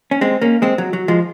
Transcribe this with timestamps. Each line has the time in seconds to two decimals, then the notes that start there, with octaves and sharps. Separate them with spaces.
0.11 C#4
0.21 G#3 C4
0.42 A#3 C#4
0.62 G#3 C4
0.78 F#3
0.93 F#3
1.08 F3 G#3